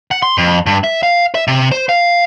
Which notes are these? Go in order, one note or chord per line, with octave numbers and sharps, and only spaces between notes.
F#5
C6
F2
G2
E5
F5
E5
C3
C5
F5